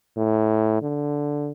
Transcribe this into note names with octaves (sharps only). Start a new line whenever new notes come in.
A2
D3